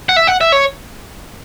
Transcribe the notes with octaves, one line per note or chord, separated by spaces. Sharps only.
F#5
E5
F#5
E5
C#5